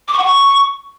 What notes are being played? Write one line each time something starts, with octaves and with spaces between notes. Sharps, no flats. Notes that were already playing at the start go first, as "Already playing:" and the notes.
D6
C#6
F#5
C#6